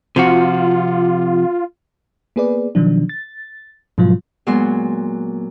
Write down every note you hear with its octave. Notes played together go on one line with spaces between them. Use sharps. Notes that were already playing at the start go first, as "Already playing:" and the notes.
C3 F3 F4 F#4
A#3 B3 G#4 B4 D5
B2 D#3 F3 F#3 D4
A6
G#2 B2 F3 F#3 F4
A#2 F#3 G#3 B3 F#4 C6